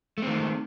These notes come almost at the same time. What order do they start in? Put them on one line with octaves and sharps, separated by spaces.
A3 C4 D#3